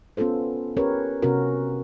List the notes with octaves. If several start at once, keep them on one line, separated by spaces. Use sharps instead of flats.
B3 C#4 F4 A4 C5
C#4 G4 A#4 B4 C#5
C3 B3 C#4 F#4 A#4